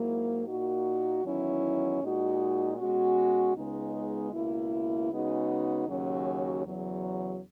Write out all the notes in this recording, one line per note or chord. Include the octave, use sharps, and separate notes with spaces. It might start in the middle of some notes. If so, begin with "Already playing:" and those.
Already playing: G#2 F#3 A#3 E4
A#2 A#3 D#4 F#4
E2 D#3 F#3 C#4 E4
A#2 G#3 D#4 F#4
B2 G#3 C#4 F#4
C#2 C#3 G#3 B3 D#4
C#2 B2 A#3 E4
C#3 G#3 B3 D#4 F#4
D#2 C#3 F#3 C#4 F#4
E2 C#3 F#3